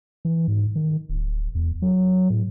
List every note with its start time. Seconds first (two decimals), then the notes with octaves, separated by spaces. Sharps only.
0.25 E3
0.48 G#2
0.76 D#3
1.09 D1
1.55 E2
1.82 F#3
2.30 A2